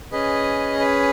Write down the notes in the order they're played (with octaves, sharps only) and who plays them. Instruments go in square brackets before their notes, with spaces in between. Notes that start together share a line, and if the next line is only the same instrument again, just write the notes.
[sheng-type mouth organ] C#4 G#4 B4 D#5
B4